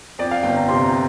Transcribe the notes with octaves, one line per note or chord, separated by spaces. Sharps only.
F2 D5
F5
G1 G5
A#5
C3 C6
A#5